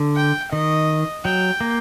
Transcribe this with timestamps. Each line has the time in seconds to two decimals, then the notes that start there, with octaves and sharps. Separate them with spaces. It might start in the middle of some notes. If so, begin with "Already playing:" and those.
Already playing: D3
0.16 G5
0.53 D#3 D#5
1.25 F#3 G5
1.61 A#3